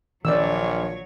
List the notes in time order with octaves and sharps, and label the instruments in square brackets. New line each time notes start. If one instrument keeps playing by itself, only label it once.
[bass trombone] A#1 [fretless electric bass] D#3 D4 [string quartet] F#3 C#5 [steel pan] D5 E6